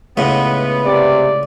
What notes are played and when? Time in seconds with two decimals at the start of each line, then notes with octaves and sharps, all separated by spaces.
0.17 C#2 A2 B3
0.85 C3 D5